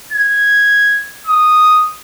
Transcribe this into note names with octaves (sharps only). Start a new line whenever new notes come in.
G#6
D#6